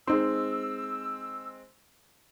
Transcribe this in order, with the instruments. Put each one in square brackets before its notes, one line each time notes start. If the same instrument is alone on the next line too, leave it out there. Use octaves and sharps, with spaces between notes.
[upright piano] G#3 C4 [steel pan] D#4 C6 [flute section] E6